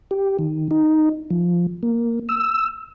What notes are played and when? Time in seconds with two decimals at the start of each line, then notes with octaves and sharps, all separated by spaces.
0.11 G4
0.39 D#3
0.71 D#4
1.31 F3
1.83 A#3
2.29 E6